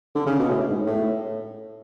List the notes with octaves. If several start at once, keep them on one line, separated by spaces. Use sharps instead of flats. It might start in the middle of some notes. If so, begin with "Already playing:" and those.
D3
C#3
B2
A2
G#2
A2